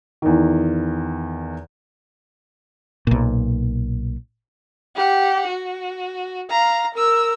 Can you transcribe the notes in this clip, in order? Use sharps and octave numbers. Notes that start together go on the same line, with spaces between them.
E2 D#3
B1 A#2
G4 F#5
F#4
F5 A#5
A#4 E6